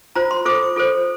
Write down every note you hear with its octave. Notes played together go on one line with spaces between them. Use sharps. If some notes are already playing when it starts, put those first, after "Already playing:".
F4 C5 A#5
C6
F4 A4 C5 D6
F4 A4 C5